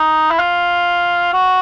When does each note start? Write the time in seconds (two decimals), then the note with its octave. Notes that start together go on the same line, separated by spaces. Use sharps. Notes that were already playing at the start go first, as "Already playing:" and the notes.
Already playing: D#4
0.31 E4
0.39 F4
1.33 F#4